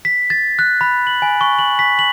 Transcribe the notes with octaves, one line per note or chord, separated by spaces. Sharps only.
B6
A6
F#6
B5
F#7
G#5
C#6
F#7
B6
F#7